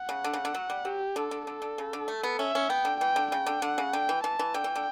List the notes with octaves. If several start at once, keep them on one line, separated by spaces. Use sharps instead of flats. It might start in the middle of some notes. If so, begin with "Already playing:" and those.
Already playing: F#5
C#3
D3
C#3
D3
F#3
G3
F#3 G4
D3 A4
D3
D3 A4
D3
C#3
D3
A3
B3
C#4 E5
C#4
B3 G5
D3
E3 G5
D3
C#3 G5
D3
D3 F#5
C#3
D3 G5
E3
E3 A5
E3
D3 G5
E3
D3